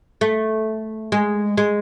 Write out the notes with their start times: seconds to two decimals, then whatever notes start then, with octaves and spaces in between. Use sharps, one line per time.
0.21 A3
1.12 G#3
1.57 G#3